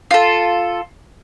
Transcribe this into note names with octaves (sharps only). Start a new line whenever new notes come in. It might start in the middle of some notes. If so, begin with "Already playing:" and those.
F4 A4